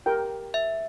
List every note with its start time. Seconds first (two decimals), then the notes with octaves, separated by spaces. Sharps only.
0.06 G4 A#4 G5
0.54 E5